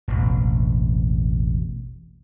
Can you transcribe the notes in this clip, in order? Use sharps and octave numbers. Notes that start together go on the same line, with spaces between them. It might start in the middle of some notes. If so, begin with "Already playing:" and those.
E1 A1